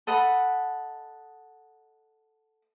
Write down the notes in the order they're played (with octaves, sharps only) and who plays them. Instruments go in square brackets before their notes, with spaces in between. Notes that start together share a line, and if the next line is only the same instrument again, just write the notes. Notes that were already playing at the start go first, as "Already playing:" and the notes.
[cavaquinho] A4 D#5 F#5 B5